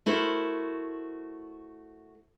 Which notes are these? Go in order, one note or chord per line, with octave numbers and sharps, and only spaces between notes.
A3 E4 F#4 A#4 C5